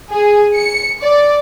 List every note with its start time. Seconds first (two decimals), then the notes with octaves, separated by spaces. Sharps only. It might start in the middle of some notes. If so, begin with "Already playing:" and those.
0.12 G#4
0.54 C#7
1.01 D5